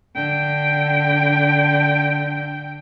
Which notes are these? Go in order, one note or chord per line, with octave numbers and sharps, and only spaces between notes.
D3 G5